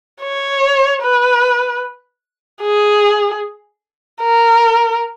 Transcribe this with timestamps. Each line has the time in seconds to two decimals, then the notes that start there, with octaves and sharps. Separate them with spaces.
0.22 C#5
1.02 B4
2.62 G#4
4.23 A#4